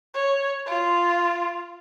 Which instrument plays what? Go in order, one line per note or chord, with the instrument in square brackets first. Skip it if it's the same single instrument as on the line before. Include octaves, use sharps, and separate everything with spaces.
[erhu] C#5
F4